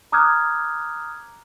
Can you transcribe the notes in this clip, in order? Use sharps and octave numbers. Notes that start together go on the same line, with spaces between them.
A#5 D6 D#6 F6 F#6 G#6